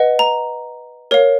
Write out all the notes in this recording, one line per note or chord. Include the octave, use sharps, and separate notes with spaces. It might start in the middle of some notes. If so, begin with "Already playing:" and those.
Already playing: B4 D#5 F#5
A#5
A#4 C#5 F5